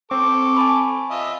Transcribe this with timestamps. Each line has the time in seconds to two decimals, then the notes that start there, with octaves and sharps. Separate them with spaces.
0.11 C4 A4 C#6 D6
0.57 G#5 A5 B5
1.11 F4 D#5 E5